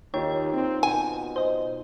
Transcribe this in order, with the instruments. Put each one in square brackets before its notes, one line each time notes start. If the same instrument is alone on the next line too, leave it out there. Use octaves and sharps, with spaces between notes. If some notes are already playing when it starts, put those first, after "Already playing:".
[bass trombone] D#2 [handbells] D#4 F4 [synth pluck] C#5 G5
[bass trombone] C4
[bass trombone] B2 [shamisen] G#5
[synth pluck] C5 D#5